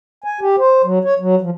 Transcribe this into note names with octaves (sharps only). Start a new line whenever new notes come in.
G#5
G4
C5
F#3
C#5
F#3
F3